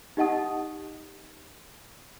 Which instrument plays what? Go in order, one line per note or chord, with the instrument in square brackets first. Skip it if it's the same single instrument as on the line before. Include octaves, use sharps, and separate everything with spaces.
[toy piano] D#4 G4 D#5 F#5 A5 D#6